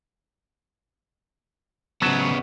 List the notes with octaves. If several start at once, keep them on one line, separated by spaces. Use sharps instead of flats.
C#3 F#3 B3 A5